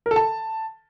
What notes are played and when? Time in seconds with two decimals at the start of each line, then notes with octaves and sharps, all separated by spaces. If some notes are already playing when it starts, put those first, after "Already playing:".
0.06 A#4
0.11 A4
0.16 A5